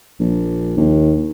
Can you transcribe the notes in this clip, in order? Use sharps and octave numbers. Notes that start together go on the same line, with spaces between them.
A#1
D#2